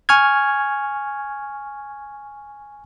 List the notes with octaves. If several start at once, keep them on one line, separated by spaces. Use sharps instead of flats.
G#5 C#6 F6 G#6